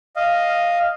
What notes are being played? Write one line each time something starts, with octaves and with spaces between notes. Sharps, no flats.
D#5 F5